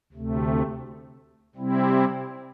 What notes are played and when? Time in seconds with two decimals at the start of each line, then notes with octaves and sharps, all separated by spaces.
0.13 D2 C3 A3
1.55 C3 G3 C4 E4